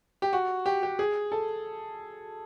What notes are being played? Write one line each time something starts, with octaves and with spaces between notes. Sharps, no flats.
G4
F#4
G4
G4
G#4
A4